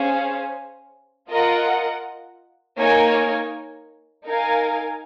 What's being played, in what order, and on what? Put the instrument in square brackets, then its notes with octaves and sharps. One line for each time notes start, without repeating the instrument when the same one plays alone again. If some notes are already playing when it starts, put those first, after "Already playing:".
Already playing: [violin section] C#4 G#4 C5 F5
F4 A#4 D#5 F#5
A#3 D#4 A#4 C#5 G#5
D#4 A#4 F5 G#5